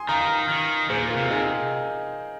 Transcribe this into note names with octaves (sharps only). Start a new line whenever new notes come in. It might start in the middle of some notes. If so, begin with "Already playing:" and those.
Already playing: G#5 C6 D#6
D#3 F5 A#5
D#3
A#2 G#4 C5
F4 A#4
C3
D#4 G#4